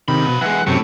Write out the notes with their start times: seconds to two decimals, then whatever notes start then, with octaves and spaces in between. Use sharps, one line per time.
0.08 C3 D#3 F3 B5
0.27 B2
0.41 E3 G#3 F#5
0.67 F#2 A2 C3 C#6